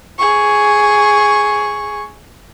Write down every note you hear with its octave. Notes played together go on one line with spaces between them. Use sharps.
G#4 C#6